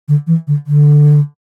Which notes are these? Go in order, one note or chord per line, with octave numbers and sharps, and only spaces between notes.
D3
E3
D3
D3